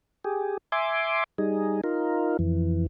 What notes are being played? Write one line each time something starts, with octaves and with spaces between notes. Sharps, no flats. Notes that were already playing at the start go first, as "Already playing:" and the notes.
G4 G#4
E5 G#5 C6 D6
G3 D#4 G#4
D#4 F4 A#4
F2 E3